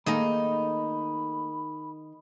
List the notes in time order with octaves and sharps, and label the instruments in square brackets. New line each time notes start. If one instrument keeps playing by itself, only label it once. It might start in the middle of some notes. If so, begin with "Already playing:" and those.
[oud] D#3 G#4 D#5 [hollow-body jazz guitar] A3 A#3 [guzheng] D#4 [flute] B5